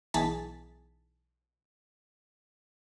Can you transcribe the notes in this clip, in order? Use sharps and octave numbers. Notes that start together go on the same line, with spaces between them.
B1 E3 G#4 A5 A6 B6